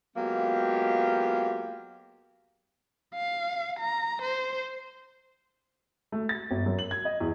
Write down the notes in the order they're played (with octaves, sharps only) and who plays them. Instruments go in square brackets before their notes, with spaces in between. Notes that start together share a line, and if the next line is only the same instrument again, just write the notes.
[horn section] F#3 G#3 A#3 B3 F4 G4
[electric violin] F5
A#5
C5
[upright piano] A3
A6
G1
F#2
F#7
G#6
D#5
E2